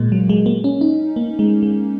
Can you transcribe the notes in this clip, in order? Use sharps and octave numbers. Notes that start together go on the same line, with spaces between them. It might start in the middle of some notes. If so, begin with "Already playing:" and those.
Already playing: A#2 G#3 A#3
F#3
G#3
A#3
C#4
D#4
A#3
G#3
G#3